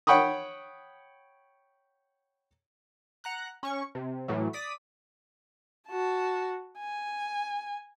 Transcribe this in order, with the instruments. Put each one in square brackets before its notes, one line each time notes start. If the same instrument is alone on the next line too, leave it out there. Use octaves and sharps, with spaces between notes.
[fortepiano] C#5 F#5 G5 B5 C#6 D#6
[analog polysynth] F#5 A#5 F#6
C#4 C#6
C3
A2 E3 F#3
D5 D#6 B6
[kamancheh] F#4 A5
G#5